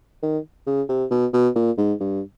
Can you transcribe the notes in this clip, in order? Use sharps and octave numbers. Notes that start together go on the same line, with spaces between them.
D#3
C#3
C3
B2
B2
A#2
G#2
G2